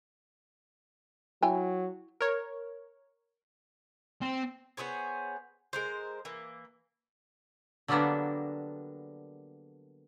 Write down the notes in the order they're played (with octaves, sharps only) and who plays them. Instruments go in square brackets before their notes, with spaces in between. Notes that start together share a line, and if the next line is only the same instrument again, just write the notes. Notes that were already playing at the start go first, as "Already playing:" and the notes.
[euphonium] F#3 [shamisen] E4 G5 G#5
[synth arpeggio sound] A#4 C#5
[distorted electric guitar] C4
[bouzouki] B3 G#4 C5 C#5
G#3 A#4 C5
E3 A#3
[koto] D3 F#3 G3 A#3 B3 D4